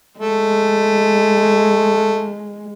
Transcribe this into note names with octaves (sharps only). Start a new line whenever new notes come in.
G#3 A3